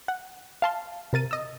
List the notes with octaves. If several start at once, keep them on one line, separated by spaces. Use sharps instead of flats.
F#5
F5 A5 C6
C3 A#4 A6 D#7
D#5 E6